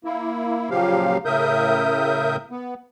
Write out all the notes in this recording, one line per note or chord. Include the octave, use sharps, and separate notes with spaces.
A#3 E4
A#2 C#3 F3 F#3 G4 F5
A2 C#3 A#4 E5 D#6 G6
B3